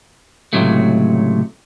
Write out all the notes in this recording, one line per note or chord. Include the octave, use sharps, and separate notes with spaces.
C#2 A2 C3 F#3 A3